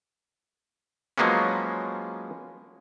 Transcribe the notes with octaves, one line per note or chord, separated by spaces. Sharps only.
F3 F#3 G#3 A#3 B3 C#4